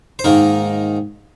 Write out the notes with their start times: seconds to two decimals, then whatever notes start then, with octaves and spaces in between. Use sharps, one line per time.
0.19 C5
0.24 G#2 D#3 A#3 D#4 A#4